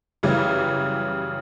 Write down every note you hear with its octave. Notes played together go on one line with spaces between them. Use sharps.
F#2 C#3 E3 G3